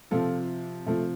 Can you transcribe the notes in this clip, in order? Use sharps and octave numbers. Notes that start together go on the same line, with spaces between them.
C3 F3 F4 A4
C3 F3 A3